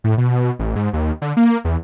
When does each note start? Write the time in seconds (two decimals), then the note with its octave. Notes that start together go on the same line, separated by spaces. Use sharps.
0.04 A2
0.18 B2
0.59 A1
0.76 G#2
0.93 D#2
1.22 D3
1.37 A#3
1.65 E2